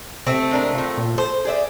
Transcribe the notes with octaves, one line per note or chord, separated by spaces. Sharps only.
C3 A3 C4
G#3 D4 A#4
A2 F4
A#2
A4 C5
G#4 D5 E5